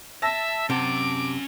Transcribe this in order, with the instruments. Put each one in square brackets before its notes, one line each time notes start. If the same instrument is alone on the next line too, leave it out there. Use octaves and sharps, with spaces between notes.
[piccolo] E5 [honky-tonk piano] A5 E6 A#6
[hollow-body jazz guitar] C3 [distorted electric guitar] C#4 F#5 [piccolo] D6